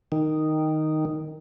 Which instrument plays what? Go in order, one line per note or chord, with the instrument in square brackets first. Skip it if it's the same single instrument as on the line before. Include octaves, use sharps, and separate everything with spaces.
[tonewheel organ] D#3